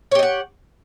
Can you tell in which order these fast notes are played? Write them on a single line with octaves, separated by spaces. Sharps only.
C#5 G4 D#5 F#5